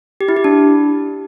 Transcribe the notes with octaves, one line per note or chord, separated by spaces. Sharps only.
G4
E4
G4
D4